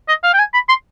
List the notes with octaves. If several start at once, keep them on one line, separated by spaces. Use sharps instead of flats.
D#5
F5
G5
G#5
B5
C6